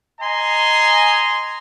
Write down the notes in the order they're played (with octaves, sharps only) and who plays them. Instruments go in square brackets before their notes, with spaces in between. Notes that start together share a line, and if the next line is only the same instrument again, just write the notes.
[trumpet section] D#5 G#5 A#5 C6